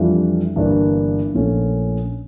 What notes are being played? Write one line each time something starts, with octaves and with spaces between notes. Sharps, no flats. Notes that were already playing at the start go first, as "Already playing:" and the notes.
Already playing: F2 E3 G3 D4 F4
G1 G2 E3 A#3 D4
A#1 A#2 F3 A3 C#4